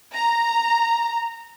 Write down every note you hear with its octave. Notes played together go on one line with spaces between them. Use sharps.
A#5